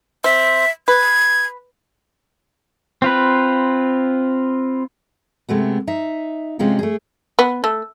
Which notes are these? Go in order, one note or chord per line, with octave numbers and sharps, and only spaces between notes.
C4 E5
B4 G#6
C4 F4 B4
C3 G#3 A3 B3
D#4 E5
C3 G#3 C4 C#4 F4
A3 G#4
B3
A3